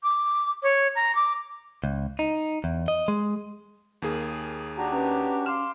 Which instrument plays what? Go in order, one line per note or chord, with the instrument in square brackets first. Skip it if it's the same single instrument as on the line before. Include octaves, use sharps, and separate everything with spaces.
[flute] D6
C#5
A#5
D6
[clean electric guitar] C#2
D#4
E2
D#5
G#3
[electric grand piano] D#2 A#3 G#4
[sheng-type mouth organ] D4 F#4 G4 [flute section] A#5
[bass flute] C#4 [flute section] B4 A#5 D6
[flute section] F5 C6 D6 [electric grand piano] F6 E7